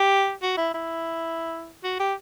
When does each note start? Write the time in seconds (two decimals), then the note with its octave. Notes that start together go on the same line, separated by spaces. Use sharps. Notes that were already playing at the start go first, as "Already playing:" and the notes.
Already playing: G4
0.43 F#4
0.57 E4
0.74 E4
1.84 F#4
2.00 G4